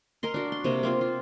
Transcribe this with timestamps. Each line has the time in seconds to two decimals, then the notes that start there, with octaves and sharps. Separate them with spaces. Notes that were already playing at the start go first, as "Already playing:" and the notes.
0.23 A#4 D#5 C6
0.34 D4 F#4
0.52 C6
0.64 C3 A#3 D#5
0.83 A#3 C4 F4
1.01 F4